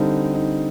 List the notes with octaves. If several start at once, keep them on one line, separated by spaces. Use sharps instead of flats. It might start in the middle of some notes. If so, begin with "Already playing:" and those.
Already playing: D3 G3 C4 D#4
D#4